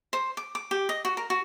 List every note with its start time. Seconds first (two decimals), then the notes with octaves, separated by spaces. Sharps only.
0.13 C5
0.37 D6
0.55 D6
0.71 G4
0.89 D#5
1.05 F#4
1.17 A#4
1.30 F#4